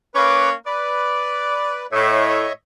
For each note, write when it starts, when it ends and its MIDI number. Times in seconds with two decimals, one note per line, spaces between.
0.15 0.53 58
0.15 0.53 61
0.15 0.50 71
0.15 0.53 73
0.15 0.50 86
0.66 1.87 71
0.66 1.86 74
1.93 2.45 45
1.93 2.53 73
1.93 2.53 75
1.93 2.53 76